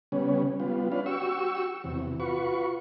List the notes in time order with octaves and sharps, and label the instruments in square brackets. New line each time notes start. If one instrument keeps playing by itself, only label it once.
[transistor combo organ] C#3 G3 B3 C#4
G3 B3 F4
C#4 D4 B4 F5
F#4 G4 C#6 E6
E2 C3
F4 F#4 B4 C#6